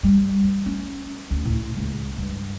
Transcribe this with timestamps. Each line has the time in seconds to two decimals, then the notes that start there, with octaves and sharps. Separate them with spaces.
0.03 G3
0.44 E3
0.66 C#4
1.30 D2
1.45 A2
1.76 C#2
2.17 G2